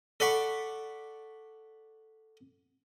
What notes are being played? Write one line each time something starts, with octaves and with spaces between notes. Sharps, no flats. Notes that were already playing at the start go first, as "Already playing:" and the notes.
A4 D5 F#5 B5 C#6